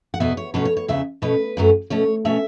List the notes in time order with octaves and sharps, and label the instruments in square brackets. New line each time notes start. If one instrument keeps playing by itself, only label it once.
[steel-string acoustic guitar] F#5
E2 B2 B3 E5
C#5
B2 F#3 A3 C#4 B4
C#5
C#5
E2 C#3 E3 E5
B2 A3 C#4 B4
F#2 F#3 A3 C#4
B2 A3 C#4 C#5
B2 A3 C#4 E5